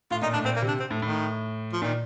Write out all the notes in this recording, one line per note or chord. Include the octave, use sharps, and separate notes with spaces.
A2 F4
A#2 D#4
A2 D4
A#2 C4
A#3
C3
D4
C4
A2
A2 D#3
F3
A#2 D#3